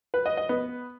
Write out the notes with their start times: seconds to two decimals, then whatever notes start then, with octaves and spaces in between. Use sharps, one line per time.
0.14 B4
0.26 D#5
0.37 D#5
0.49 B3